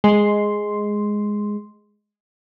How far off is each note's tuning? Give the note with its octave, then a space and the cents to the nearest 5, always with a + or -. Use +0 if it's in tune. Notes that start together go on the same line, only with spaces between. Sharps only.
G#3 +0 C6 +0